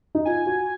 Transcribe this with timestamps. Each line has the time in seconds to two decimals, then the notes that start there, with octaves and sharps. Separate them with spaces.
0.15 D#4
0.25 F4 G#5
0.46 F#4